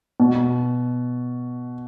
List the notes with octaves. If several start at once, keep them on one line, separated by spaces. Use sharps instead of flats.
B2